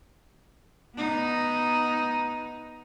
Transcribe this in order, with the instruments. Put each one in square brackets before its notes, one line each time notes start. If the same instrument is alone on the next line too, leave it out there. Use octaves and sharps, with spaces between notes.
[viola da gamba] B3 D#4